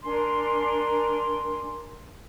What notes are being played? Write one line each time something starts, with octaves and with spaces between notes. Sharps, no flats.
D4 A#4 G#5 C6